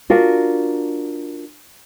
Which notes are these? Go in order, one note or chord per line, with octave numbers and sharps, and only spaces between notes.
D4 F4 F#4 A#4